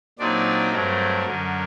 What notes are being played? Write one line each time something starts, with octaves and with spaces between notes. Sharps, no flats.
A#2 F#3 C4 D4 D#4 D5
G2 F#3 A3 C4 A#4
F#2 D3 F#3